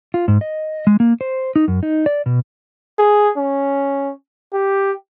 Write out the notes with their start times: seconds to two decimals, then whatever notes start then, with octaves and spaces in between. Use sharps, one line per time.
0.14 F4
0.28 G#2
0.41 D#5
0.87 G#3
1.00 A#3
1.21 C5
1.56 D#4
1.68 F#2
1.83 D#4
2.06 D5
2.26 B2
2.99 G#4
3.37 C#4
4.53 G4